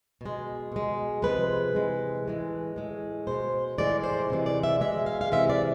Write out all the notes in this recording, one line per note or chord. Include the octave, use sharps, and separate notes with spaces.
B2 G#3
B2 G#3
C3 F3 G#3 B4
C3 E3 G#3
A2 E3 G#3
A2 G#3
B2 G#3 C5
A2 E3 G#3 D5
C5
C3 E3 G#3
D5
E5
B2 G#3 E5
F5
F5
C3 E3 G#3 E5
D5